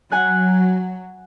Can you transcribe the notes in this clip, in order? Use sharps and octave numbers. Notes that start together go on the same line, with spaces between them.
F#3 F#5 G#5 F#6